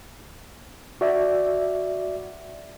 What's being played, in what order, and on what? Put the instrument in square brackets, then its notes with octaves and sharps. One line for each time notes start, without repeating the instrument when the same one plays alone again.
[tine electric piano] F#4 D5 E5